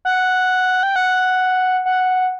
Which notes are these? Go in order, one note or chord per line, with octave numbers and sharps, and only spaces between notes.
F#5
G5
F#5
F#5